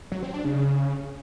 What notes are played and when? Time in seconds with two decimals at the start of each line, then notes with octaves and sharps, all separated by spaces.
0.12 F#3
0.23 C4
0.34 D4
0.45 C#3